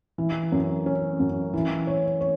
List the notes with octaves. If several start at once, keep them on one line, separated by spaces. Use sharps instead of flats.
E3
F#2
C#4
F#2
E3
C#5
C#5